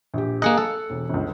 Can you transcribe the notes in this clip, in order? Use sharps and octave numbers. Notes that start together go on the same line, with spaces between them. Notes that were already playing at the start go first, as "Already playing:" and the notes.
A#1 G4
A#3 G#4 D#5 F#6 C#7
A4
E1
G1 C#2